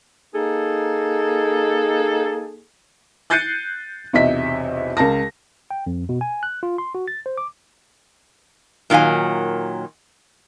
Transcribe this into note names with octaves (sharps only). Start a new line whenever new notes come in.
A#3 D#4 G#4 A4
F#6 G6 A6 C7 C#7 D#7
B1 E2 C3 D#5 E5 B6
C#2 A#4 A5 A#6
G5
F2
B2
G#5
F#6
F4
C6
F#4
A6
C5
D6
A#2 D#3 F#3 F5 G#5